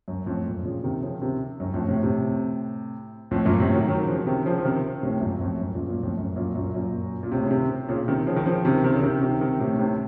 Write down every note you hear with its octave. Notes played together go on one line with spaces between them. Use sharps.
F#2
F2 A2
F#2 A#2
A#2 C#3
C3 D#3
C#3 F3
C3 D#3
F#2
F2 A2
A2 C3
A2 C3
F2 A2
F#2 A#2
A2 C3
D#3 F#3
D#3 F#3
C#3 F3
C3 D#3
C#3 F3
F3
C3 D#3
A2 C3
F#2 A#2
F2 A2
F#2
A#2 C#3
F#2 A#2
F2 A2
F#2
F#2 A#2
F#2 A#2
F#2 A#2
A#2
A2 C3
C#3
C3 D#3
A#2 C#3
C3 D#3
C#3 F3
D#3
C#3 F3
C3 D#3
C3 D#3
C#3
C3 D#3
C3 D#3
C3 D#3
A2 C3
A2 C3